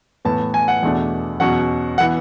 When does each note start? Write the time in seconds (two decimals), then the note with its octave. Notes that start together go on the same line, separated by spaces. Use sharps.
0.25 A2 E3 B3 A5
0.54 G#5
0.68 F#5
0.82 E2 B2 A3 D4
1.40 E2 B2 F#3 C#4 F#5
1.98 F#5
2.01 E3 B3